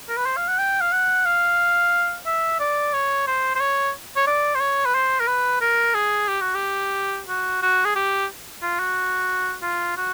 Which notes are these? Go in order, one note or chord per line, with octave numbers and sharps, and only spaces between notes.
A#4
B4
C5
F5
F#5
G5
F5
F#5
F5
E5
D5
C#5
C5
C5
C#5
C#5
D5
C5
C#5
B4
C5
A#4
B4
A#4
G#4
G4
F#4
G4
F#4
F#4
G#4
G4
F4
F#4
F4
F#4